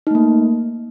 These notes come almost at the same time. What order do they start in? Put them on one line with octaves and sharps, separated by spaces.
D#4 A3 A#3